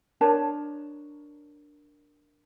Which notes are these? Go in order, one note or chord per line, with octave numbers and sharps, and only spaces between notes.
D4 A#4 C#5 A5